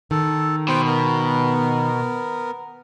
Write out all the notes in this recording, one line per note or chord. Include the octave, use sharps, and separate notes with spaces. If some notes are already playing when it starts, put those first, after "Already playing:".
D#3 A4
B2 C5 G5
B3 A#4